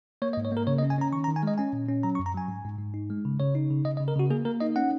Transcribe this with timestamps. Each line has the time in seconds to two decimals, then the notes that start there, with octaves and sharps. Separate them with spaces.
0.22 A#3 C#5
0.33 D#5
0.37 G#2
0.45 C#5
0.52 A#3 A#4
0.67 C#3 C#5
0.78 D#5
0.83 C#4
0.90 G#5
0.98 C#4 A#5
1.13 D#3 C#6
1.24 A#5
1.28 D#3
1.36 G#5
1.43 G#3 D#5
1.58 C#4 G#5
1.73 A#2
1.89 C#4
2.03 F#3 A#5
2.15 C#6
2.19 F#2
2.26 A#5
2.34 F#3 G#5
2.49 G#2
2.64 G#2
2.79 G#2
2.94 D#4
3.10 G#3
3.25 C#3
3.40 C#3 C#5
3.55 D#4
3.71 C#3
3.85 C#3 D#5
3.97 D#5
4.00 C#3
4.08 A#4
4.16 C#3 F#4
4.30 A#3 G#4
4.45 A#3 A#4
4.60 D#4 D#5
4.76 C#4 F#5